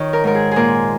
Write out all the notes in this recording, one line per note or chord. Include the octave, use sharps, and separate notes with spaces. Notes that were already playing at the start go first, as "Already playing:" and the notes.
Already playing: D#3 C#5
A#4
G#2 A#4
G#4
A#2 G#4 A#4